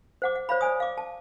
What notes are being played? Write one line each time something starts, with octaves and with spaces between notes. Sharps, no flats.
C5 F#5 D6
F#5
C5 C#5 F5 B5
C5 D5 G#5 D#6
F5 D6
A5